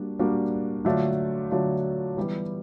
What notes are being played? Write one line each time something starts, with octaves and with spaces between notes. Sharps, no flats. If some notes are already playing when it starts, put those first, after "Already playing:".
Already playing: G3 A#3 D4 F#4
G3 A#3 D4 F#4
D3 F#3 A3 D4 F4
D3 F#3 A3 D4 F4
E3 G3 B3 E4 G4